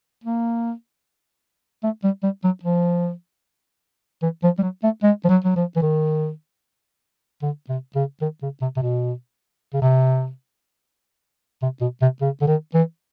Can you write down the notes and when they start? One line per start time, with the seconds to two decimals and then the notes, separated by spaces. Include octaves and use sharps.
0.24 A#3
1.84 A3
2.04 G3
2.23 G3
2.44 F#3
2.63 F3
4.22 E3
4.43 F3
4.59 G3
4.63 F#3
4.83 A3
5.03 G#3
5.25 F3
5.29 F#3
5.44 F#3
5.56 F3
5.76 E3
5.82 D#3
7.42 D3
7.69 C3
7.95 C#3
8.22 D#3
8.42 C#3
8.61 C3
8.76 C3
8.82 B2
9.74 C#3
9.82 C3
11.62 C3
11.81 B2
12.02 C3
12.21 C#3
12.42 D3
12.47 D#3
12.74 E3